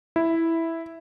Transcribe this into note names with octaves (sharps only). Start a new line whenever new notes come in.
E4